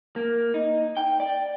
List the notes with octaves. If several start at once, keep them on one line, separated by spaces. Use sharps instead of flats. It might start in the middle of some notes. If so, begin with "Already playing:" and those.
A#3
D#4
G5
D5